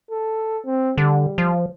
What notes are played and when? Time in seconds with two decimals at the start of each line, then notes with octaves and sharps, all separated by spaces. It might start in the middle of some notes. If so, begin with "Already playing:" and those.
0.11 A4
0.65 C4
0.98 D3 G3
1.38 F3